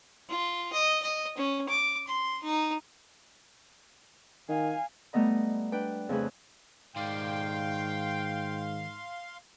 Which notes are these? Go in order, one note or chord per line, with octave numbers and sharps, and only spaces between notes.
F4
D#5
D#5
C#4
D6
C6
D#4
D#3 F5 G#5
G3 A3 B3 D#5 A#5
D4 B4 G5
F2 C#3 A3 G#4 B4
G#2 D#3 D5 F5 G5 C6